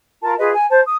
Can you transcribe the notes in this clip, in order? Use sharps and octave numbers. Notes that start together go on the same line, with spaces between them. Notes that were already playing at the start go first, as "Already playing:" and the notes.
F4 A#4 A5
F4 G#4 B4 D#5
G#5
C5 A5
D#6